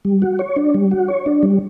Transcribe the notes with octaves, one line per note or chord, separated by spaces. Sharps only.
G3
F#4
C#5
D4
G3
F#4
C#5
D4
G3